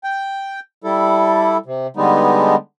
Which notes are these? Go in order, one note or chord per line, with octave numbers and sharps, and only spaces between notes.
G5
G3 E4 A4
C3
D3 G3 G#3 B3 D#4